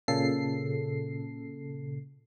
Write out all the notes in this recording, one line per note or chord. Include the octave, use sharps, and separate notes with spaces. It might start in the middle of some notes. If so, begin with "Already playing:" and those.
A#2 C#3 A4 C7